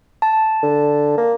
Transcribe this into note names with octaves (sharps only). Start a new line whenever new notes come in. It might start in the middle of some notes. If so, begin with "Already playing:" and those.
A5
D3
A#3